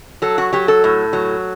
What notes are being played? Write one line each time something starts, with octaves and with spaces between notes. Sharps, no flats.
F#3 A4
F#4
F#3 G4
A4
A2
F#3